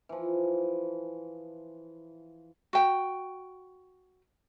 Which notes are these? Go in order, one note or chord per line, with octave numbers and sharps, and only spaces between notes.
E3 F3
F#4 G5